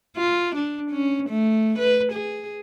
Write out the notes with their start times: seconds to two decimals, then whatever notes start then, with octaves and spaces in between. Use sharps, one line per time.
0.17 F4
0.56 D4
0.91 C#4
1.29 A3
1.79 B4
2.13 G#4